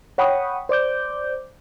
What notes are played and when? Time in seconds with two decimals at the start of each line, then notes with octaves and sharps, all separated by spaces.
0.18 C#5 F#5 G5 B5 C#6 D#6
0.69 C5 D5 D6 G6